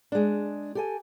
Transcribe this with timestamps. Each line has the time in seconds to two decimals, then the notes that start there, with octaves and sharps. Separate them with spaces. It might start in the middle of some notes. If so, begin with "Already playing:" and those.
0.12 G#3 D4
0.75 G4 A4 G#5